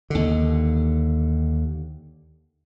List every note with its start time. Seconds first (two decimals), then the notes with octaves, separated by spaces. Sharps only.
0.10 D#2 D3